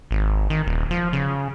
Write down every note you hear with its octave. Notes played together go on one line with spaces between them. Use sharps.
G#1
D#3
D#1
F3
C#3